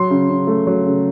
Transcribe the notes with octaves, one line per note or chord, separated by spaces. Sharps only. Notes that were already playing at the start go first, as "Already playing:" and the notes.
Already playing: F#3 C6
C#3
C#3
A3
F#3
C#3